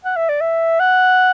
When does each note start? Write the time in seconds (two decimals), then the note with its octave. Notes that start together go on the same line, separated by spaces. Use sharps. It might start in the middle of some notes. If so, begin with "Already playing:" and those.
0.05 F#5
0.17 E5
0.29 D5
0.41 E5
0.80 F#5